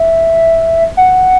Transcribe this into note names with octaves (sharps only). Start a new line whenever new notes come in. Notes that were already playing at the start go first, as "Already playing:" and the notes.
Already playing: E5
F#5